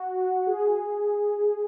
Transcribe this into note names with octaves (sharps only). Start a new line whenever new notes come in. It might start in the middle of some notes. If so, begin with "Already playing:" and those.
Already playing: F#4
G#4